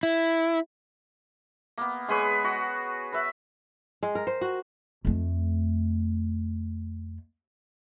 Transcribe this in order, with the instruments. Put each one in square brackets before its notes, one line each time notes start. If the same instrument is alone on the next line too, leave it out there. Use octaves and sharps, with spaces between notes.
[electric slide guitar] E4
[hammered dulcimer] A#3 B3
G#3 G#4 B4 C#5
F#4
B4 E5
[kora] G#3
A#4
C5
F#4
[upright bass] F2 A3